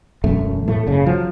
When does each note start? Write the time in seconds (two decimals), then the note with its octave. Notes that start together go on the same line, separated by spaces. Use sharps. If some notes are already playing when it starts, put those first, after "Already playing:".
0.24 E1 F#2 A3
0.68 A2 A3
0.86 F#1 C#3
1.06 F3 F#3